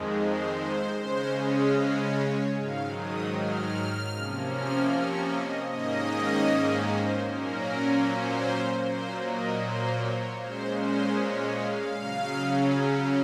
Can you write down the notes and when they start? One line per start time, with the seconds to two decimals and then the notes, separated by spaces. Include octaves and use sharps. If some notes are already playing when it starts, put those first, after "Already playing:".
Already playing: F2 D#3 G#3
0.19 C5
0.58 C5
0.98 C#3 G#3 C#4 C5
1.37 C#5
2.15 C#5
2.55 G#2 D#3 F#3 F5
2.94 D#6
3.33 F6
4.12 C3 F3 A#3 C#4
4.51 F6
4.91 C#6
5.30 D#5
5.69 G#2 D#3 A#3 C#4 D#5
6.87 C5
7.26 A#2 F#3 A#3 C#4 A#4
8.05 C5
8.83 A#2 F#3 A#3 C5
9.22 D#5
9.61 C5
10.00 C#5
10.40 A#2 G#3 C#4 C5
10.79 C5
11.18 C#5
11.57 F5
11.97 C#3 F#3 C#4